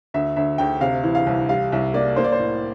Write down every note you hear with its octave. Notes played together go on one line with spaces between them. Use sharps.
D2 E5
D2 E5
D2 G5
C3 F5
E3
F5
C2
G3 F5
C2 E5
A#3 D5
A#3 C5
D5
C5
A2